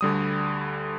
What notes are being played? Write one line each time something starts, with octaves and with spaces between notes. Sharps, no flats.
D2 D3 G3 D#6